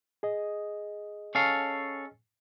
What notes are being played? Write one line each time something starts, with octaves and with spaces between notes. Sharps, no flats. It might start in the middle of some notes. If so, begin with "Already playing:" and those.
G#4 D#5
C#4 A4 F5